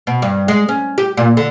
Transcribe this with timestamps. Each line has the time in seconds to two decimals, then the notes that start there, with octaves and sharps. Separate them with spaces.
0.07 B2
0.22 G2
0.48 G#3
0.69 C#4
0.98 G4
1.17 A#2
1.37 D3